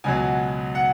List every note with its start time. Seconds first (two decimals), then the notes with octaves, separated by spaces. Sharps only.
0.04 C#2 B2 F#3 G#5
0.75 F#5